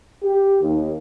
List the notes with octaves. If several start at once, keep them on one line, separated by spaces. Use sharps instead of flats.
G4
D#2